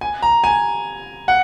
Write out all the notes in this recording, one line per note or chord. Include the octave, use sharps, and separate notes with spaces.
G#5
A#5
G#5
F#5